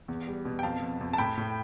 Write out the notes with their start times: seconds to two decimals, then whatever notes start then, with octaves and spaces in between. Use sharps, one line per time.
0.08 E2
0.28 G3
0.45 B2
0.59 G5
0.63 F2 F5 A5
0.82 F2
1.01 F2
1.13 A5
1.18 A2 G5 B5
1.37 A2